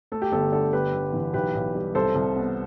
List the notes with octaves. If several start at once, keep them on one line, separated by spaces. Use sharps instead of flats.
A3 A4
G4
G1 A4
D3 A4
G1 G4 B4
G1
E3
B1 G4 B4
B1
G3
C2 A4 C5
C2
B3